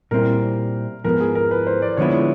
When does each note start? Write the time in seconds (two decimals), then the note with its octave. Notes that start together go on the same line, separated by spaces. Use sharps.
0.11 A#2 G3 C4 E4 A#4
1.04 G#2 F3 G#3 B3 A#4
1.21 G#4
1.35 A#4
1.51 B4
1.67 C5
1.82 D5
1.97 D3 F3 G#3 B3 E4 C#5